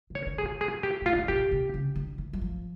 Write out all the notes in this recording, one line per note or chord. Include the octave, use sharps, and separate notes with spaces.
C#3
C#5
D3
G#4
B2
G#4
G4
A2 F4
A#2
B2 G4
C3
C#3
D3
E3
F#3
F3